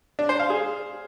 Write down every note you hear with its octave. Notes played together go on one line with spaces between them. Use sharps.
D4
C5
F5
G#4